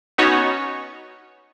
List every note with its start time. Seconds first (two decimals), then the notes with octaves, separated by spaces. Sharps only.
0.18 B3 C#4 D#4 F#4 C#5